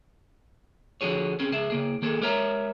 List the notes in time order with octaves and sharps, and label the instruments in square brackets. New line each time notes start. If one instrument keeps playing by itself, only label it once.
[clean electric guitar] D3 F3 F#4 G#4 C#5
C4 C#4 G#4
C#2 G#4 E5
C#3 A#3 G#4
D#3 A#3 G#4 A4
G#3 G4 A#4 C#5 E5 A#5